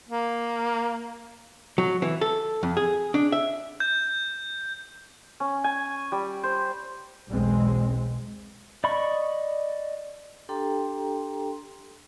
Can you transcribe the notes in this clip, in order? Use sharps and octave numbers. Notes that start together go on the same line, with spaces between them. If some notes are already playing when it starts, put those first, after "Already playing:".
A#3
F#3
E3
A4
F2
G#4
D4
E5
G6
C#4
G#5
G3
C5
B1 E2 G#3 C4
D5 D#5 B5 C#6
D4 G4 A4 G5 A#5 C6